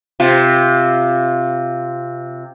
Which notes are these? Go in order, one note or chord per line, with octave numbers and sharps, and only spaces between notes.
C3 F4